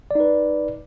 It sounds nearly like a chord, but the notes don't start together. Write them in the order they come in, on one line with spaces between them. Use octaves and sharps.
D5 D#4 B4